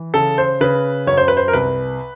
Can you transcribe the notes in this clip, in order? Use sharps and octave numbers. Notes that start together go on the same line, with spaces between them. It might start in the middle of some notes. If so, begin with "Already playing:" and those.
Already playing: E3
C#3 A4
C5
C#3 B4
F#2 C#5
C5
B4
C5
A#4
C2 B4